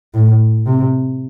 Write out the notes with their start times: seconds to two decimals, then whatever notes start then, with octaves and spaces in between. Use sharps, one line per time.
0.14 A2
0.66 C3